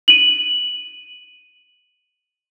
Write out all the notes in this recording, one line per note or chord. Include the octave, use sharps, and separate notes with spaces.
D#7 F#7